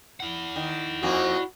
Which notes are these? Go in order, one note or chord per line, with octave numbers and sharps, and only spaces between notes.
E4 F#5
D#3
F2 A#3 F#4